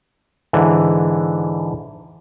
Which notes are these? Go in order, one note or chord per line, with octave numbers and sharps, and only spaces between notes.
G#2 D3 E3